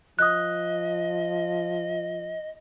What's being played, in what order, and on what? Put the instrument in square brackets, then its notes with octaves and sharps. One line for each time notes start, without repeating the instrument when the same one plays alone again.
[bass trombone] F3 [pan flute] D#5 [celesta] D#6 F#6